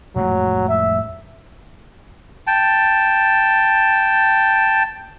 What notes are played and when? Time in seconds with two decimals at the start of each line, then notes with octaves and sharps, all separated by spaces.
0.16 F2 A2 F#3 G#3
0.69 E5
2.47 G5 A5